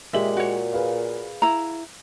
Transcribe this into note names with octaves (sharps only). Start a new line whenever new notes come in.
A#2 G#3 G4 E5 F#7
F#4 C#5
G#4 B4 F5
E4 A#5